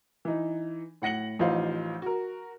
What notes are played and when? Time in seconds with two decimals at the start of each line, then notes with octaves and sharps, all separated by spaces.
0.25 E3 D#4
1.02 A2 F#5 A#6 C#7 F#7
1.39 A1 F3 D#4 C5 F5
2.02 F#4 A#4